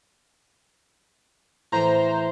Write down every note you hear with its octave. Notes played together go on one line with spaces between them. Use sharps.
A2 E3 C5 A#5